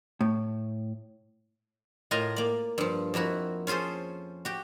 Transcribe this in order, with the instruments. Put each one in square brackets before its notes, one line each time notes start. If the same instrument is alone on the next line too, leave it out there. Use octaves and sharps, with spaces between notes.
[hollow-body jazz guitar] A2
[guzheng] A2 F4 A#4 D#5 G#5 A#5
A#3 D5
G2 F3
F2 A#3 E4 F#4
C#4 F4 G#4 A4 C5
F#4 G4